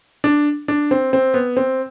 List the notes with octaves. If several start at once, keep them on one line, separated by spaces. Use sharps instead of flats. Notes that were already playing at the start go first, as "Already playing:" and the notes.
D4
D4
C4
C4
B3
C4